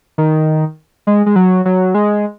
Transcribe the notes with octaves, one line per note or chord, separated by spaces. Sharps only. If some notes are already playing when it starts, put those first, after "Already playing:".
D#3
G#3
G#3
F#3
F#3
G#3